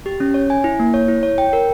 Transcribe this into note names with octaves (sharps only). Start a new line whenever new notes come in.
G4
C#4
C#5
G#5
E4
A#3
C#5
E4
C#5
G5
A#4